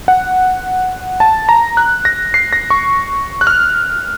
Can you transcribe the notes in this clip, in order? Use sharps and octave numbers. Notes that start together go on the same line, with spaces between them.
F#5
A5
A#5
F#6
A#6
C7
A#6
C#6
F#6
F6